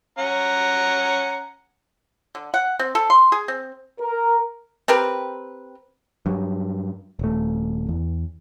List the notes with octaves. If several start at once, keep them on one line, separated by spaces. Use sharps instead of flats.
C#4 F#5 A#5
D3
F#5
C4
A4
C6
G#4
C4
A#4
C4 G4 A#4 B4
G2 F#3
D#1 A3
E2